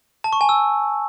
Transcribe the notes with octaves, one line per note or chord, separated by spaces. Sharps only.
A5
C#6
G#5
E6